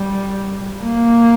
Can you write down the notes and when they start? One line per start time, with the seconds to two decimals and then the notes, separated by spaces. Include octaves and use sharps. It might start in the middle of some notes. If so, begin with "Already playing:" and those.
Already playing: G3
0.83 A#3